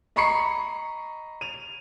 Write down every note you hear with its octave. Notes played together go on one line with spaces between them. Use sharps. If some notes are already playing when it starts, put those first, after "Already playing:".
D#5 A#5 B5 C#6 C7 C#7
D#7 F7